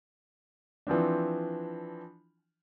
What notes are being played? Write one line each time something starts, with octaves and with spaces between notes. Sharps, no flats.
E3 F3 C4 D4